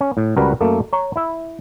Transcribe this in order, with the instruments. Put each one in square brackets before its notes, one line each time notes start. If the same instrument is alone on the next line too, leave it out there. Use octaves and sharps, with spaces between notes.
[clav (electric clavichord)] C#4
A2
C#2 G3 F#4 A#4 B4
F#2 A3 A#3
C#5 A#5
E4 E5